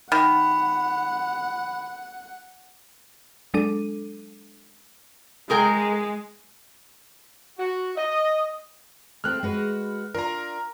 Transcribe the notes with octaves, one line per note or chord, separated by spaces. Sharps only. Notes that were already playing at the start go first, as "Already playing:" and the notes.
D#3 F#5 B5
F#3 G#3 D4 A4 D6 D#7
G#3 G#4 A#4 G5
F#4
D#5
A3 C4 G4 F6 F#6
G#3 F#4 B4
D4 F4 A#4 A#5